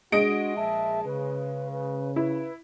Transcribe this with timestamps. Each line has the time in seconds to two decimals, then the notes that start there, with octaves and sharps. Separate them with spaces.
0.12 G#3 D4 F#4 D#5 D7
0.56 A#1 E5 A5
1.05 C#3 B4
1.72 B4
2.16 E4 B4